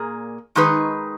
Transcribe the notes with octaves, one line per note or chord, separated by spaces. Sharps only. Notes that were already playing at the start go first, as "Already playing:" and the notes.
Already playing: A#2 A#3 G#4
D#3 G#3 D#4 G#4 B4